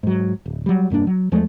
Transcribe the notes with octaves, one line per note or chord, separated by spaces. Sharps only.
G#2 F#3
D1
F#3 G3
F1 G2 A#3 D4
F#3
E2 F3 G#3 A3